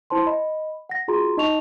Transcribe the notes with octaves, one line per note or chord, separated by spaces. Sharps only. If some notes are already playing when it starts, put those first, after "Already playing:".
E4 C5 A5 C6
D#5 B5
F#5 A#6
F4 F#4 G#4 A#5 C6
D#4 D#5 A5 C#6 F7